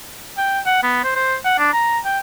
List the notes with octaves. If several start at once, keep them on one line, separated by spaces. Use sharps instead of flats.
G5
F#5
B3
C5
C5
F#5
D4
A#5
G5